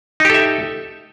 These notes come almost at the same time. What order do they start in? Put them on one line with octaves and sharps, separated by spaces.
D#4 G4 A4 E5